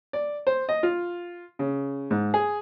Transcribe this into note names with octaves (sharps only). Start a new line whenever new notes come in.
D5
C5
D#5
F4
C#3
G#2
G#4